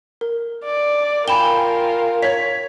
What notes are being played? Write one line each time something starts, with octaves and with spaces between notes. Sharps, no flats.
A#4
D5
F4 A#4 G5 G#5 B5 E7 G7
C#5 G#6 B6